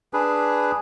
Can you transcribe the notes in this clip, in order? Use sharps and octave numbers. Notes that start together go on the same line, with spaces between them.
D4 G#4 B4